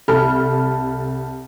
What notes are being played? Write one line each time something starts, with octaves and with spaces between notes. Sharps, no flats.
C2 A4 B5 F6